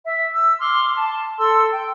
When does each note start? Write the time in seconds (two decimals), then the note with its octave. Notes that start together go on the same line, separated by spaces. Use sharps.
0.04 E5
0.32 E6
0.58 C6 D6 F6
0.96 A5
1.38 A4 C6 E6
1.70 G5